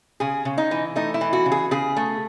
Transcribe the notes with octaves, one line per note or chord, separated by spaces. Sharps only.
C#3 G#4
C#3
D#4
E3
A3 D#4
E4
E3
F#4
C#3
G#4
C#3 G#4
A3